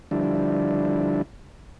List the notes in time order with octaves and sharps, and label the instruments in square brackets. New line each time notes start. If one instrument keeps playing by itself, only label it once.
[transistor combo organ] D3 F3 G3 D4 E4